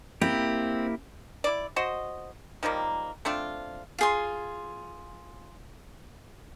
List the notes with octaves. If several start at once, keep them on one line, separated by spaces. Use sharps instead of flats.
A#3 C4 E4 G4
E4 D5
F#4 C5 D#5
D#3 F3 G3 A#3
A3 C4 D4 F4
F4 G#4 C6